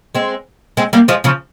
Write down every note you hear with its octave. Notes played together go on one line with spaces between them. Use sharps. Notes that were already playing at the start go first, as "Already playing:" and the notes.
G#3 C4
G#3 C4
G3 A#3
F3 G#3
C#3 F3